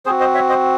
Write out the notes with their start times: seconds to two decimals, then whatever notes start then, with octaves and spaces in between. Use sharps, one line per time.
0.06 C4 F#4 G#4 C5
0.20 C5 D#5
0.35 C#5 E5
0.49 C5 D#5